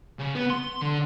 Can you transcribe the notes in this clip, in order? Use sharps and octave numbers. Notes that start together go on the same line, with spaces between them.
C#3
B3
C6
D3